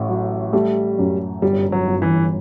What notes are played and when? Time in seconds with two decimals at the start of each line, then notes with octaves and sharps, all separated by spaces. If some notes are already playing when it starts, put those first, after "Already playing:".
Already playing: A1 A2
0.08 F#3
0.53 G3 A3
0.98 F#2
1.42 G1 G3
1.72 F#3
1.87 G1
2.02 E3